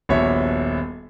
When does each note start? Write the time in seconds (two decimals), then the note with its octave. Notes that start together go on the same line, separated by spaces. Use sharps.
0.09 D#1 A#1 B3 F#4 C#5 E5